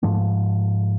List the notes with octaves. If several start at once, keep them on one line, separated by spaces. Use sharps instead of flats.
G#2 F3 A3